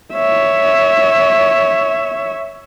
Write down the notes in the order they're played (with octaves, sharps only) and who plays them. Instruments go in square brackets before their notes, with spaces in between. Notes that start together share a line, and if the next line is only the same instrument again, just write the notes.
[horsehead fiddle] C#5 E5